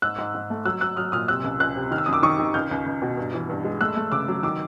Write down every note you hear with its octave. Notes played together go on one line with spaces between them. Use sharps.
G#2 E6 F#6
G#2
G#2
A3
F#3 E6 F#6
F#3 E6 F#6
F#3 D#6 F6
A#2 D#6 F6
C3 E6 F#6
C#2
C#2 E6 F#6
C3
D#3 F6
E6
F#2 D#6
D6 E6
D#3 C#6 D#6
D#3
C#2 F6 G6
C#2
C#2
B2
G2
E3
G2
G#3
A3 E6 F#6
A3
C#3 D6 E6
F#3
D#3 D6 E6